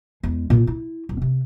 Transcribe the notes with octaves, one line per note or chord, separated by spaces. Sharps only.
E2 G#3
A#2 F4
E4
D#1
C3